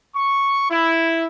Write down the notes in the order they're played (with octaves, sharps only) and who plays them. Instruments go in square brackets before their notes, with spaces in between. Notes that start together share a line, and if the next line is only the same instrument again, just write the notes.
[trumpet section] C#6
E4